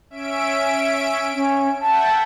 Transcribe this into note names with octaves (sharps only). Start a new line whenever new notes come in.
C#4 E5 D7
C#4
E5 F#5 G5 A5